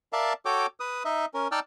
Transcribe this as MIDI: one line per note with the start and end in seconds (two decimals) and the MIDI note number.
0.13 0.33 70
0.13 0.33 74
0.13 0.33 76
0.13 0.33 77
0.13 0.33 81
0.45 0.66 66
0.45 0.66 69
0.45 0.66 73
0.45 0.66 79
0.45 0.66 86
0.80 1.03 71
0.80 1.03 87
1.05 1.26 63
1.05 1.26 75
1.05 1.26 76
1.34 1.48 61
1.34 1.48 70
1.52 1.60 63
1.52 1.60 74
1.52 1.60 79
1.52 1.60 81
1.52 1.60 88
1.52 1.60 89